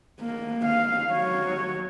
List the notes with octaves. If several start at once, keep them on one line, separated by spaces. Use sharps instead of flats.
A#3
F5
F#3 C#5